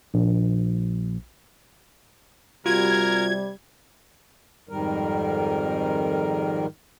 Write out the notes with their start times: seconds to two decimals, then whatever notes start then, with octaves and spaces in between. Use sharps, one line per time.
0.14 A#1
2.66 C3 G3 F4 F#4 A#4 G#6
4.69 F2 G#2 D#3 G3 A#4